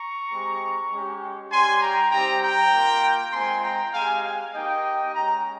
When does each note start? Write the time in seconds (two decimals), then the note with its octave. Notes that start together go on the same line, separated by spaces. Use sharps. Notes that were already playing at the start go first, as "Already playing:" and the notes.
Already playing: A#5 C#6
0.30 G#3 C4 G4
0.91 G#3 C#4 G4
1.52 G3 C#4 G4 G#5 C6
1.81 G5 A#5
2.12 G3 C4 D#4 G4 G5 A#5
2.42 G5 A#5
2.73 A#3 F4
3.33 G#3 C4 F4 G#5 C6
3.63 G5 A#5
3.94 G#3 C4 G4 F5 G#5
4.24 F5 G#5
4.54 A#3 D#4 G4 D#5 G5
5.15 G#3 C#4 G4 G5 A#5